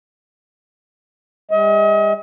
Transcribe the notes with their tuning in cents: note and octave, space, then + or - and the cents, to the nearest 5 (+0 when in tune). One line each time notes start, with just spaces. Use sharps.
G3 +45 D#5 +40